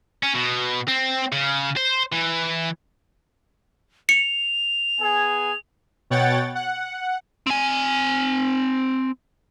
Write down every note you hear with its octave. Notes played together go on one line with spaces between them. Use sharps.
C#4
B2
C4
C#3
C5
E3
C#7 F7
B3 G#4 G#5
B2 C#5 F#5 G5 A6
F#5
C4 G#5